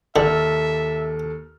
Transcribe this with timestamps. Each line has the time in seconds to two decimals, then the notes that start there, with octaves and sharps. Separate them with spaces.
0.16 D#2 D3 A4 E5 F6